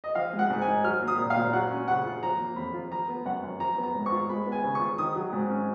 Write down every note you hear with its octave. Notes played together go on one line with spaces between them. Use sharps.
D#5
F3 F5
G#3
F#5
G#2
G#5
D#4
F#3 F6
A#3
D#6
A#2
F5
A#2
F#3 F#5
C#4
C#3 F#5
F4
F3 A#5
A#3
F2 B5
F4
F3 A#5
B3
F#2 F#5
F#2
F3 A#5
B3
A#5
G#2
C#6
F4
G#3 B5
B3
G#5
C#3
C#6
F4
D#3 D#6
F#3
G#2
C#4